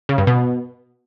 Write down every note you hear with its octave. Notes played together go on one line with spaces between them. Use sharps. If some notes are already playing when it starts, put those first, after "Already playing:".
C#3
G2
B2